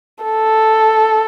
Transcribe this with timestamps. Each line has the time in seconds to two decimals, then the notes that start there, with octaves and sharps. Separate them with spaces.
0.24 A4